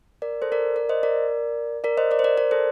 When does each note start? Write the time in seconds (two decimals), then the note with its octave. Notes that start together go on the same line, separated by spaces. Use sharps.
0.22 A#4 D5
0.42 A4 C5
0.52 A#4 D5
0.76 A#4 D5
0.89 C5 D#5
1.03 A#4 D5
1.84 A#4 D5
1.97 C5 D#5
2.11 A#4 D5
2.19 C5
2.24 A#4 D5
2.38 A#4 D5
2.51 A4 C5